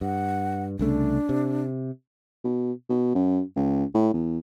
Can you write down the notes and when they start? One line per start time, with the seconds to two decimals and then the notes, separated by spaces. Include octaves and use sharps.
0.01 G2 F#5
0.79 C2 C#3 A3 D4
1.29 C3
2.44 B2
2.89 B2
3.15 F#2
3.56 C#2
3.94 A2
4.14 E2